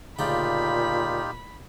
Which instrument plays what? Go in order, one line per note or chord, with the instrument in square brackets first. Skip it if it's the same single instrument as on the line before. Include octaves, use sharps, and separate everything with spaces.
[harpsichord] D2 C#3 D5 [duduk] A#2 [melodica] D#4 F4 G4 [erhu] B5